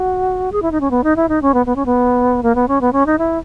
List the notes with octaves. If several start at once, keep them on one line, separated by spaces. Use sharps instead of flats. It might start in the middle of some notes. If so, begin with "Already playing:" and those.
Already playing: F#4
G#4
E4
D#4
C#4
B3
D#4
E4
D#4
C#4
B3
B3
C#4
B3
A#3
B3
C#4
B3
C#4
D#4
E4